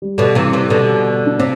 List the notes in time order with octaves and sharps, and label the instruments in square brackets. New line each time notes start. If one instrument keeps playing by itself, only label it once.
[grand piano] G3
[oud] B2 D3
[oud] C3 E3 [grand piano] G3
[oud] C3 E3
B2 D3
[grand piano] D4
[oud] C3 [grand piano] C4